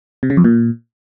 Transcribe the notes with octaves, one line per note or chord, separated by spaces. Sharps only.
C3
C#3
F2
A#2